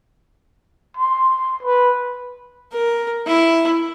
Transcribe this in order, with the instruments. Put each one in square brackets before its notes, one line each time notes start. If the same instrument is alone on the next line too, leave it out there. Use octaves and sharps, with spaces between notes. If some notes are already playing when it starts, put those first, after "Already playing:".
[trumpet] C6
B4
[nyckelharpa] A#4
E4